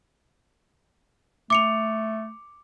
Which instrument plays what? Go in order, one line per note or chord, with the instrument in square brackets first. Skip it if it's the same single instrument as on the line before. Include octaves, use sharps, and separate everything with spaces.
[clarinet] A3 [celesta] D6 C#7 F7